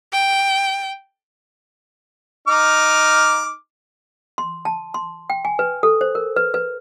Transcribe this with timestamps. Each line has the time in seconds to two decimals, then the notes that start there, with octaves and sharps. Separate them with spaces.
0.12 G5
2.48 D#4 D6 F6
4.38 C6
4.65 A5
4.94 C6
5.30 G5
5.45 G#5
5.59 B4
5.83 A4
6.01 C5
6.15 A#4
6.36 B4
6.54 B4